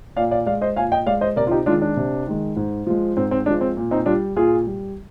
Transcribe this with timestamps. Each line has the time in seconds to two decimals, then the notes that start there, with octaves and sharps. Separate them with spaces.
0.16 A#2 D5 F5
0.31 D5 F5
0.46 G#3 D5 F5
0.61 C5 D#5
0.76 A#2 F5 G#5
0.92 D#5 G5
1.06 G#3 D5 F5
1.21 C5 D#5
1.36 C3 A#4 D5
1.47 F4
1.51 D#4 G4
1.66 D#3 G#3 D4 F4
1.82 D4
1.97 C3
2.27 D#3 G#3
2.56 G#2
2.87 F3 G#3
3.17 G#2 C4
3.31 C4
3.46 F3 G#3 D4
3.61 C4
3.77 A#2
3.91 C4 D#4
4.06 G3 D4 F4
4.36 A#2 F4 G#4
4.67 G3